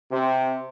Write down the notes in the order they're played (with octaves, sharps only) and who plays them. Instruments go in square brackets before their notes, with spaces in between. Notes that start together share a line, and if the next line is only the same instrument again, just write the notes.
[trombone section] C3 C4